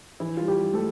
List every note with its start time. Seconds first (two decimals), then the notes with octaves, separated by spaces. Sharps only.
0.20 E3 E4
0.37 G3 F4
0.48 G3 G4
0.60 G2
0.74 A3 A4